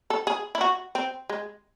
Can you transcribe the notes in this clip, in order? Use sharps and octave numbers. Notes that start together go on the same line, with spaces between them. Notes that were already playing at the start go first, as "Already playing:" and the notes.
A4
G#4
E4
F#4
C4
G#3